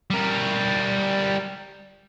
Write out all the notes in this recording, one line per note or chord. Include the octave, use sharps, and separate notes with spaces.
G3 A#4